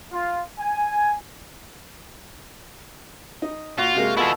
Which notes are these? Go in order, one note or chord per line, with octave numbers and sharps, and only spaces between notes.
F4
G#5
D#4
A#2 F4 F#4
C3 G#3 A#3
B2 E4 F4 G#4 A4